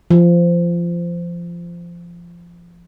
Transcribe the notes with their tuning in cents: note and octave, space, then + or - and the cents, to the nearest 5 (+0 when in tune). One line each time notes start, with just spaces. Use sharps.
F3 -20